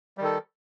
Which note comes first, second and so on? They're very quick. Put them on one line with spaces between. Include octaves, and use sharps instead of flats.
G3 D#3 A4